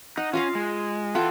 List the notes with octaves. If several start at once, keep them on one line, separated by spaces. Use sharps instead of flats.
D#4 F#5
C#4 F4 D#5 F5
G#3
E3 F4 A4 F#5 G5